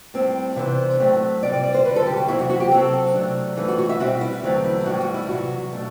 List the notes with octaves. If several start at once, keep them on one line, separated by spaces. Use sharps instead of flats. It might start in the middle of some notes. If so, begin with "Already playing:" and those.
A2 G3 C4
C3 E3 B3 D4 C5
A2 F#3 A3 C4
C3 G3 C4 D5
D5
D5
C5
F#2 D3 G3 B4
A4
G4
F#4
E2 C3 F#3 C4 E4
F#4
F#4
G4
C3 F#3 C4 A4
C3 F#3 A3 D4
G2 E3 A3 A4
F#4
F#4
E5
B2 G3 C4 F#4
E4
E2 D3 F#3 A3 C4
E4
A2 E3 G3 F#4
F#4
E4
E2 C3 F#3 F#4
B2 A3 D4